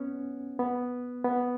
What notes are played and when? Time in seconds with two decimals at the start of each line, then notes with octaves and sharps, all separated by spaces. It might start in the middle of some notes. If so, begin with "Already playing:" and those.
Already playing: B3 C#4
0.59 B3
1.25 B3